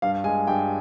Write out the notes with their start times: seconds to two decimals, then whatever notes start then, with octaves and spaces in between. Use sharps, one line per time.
0.02 G2 F5
0.24 G#3 G#5
0.47 G2 G5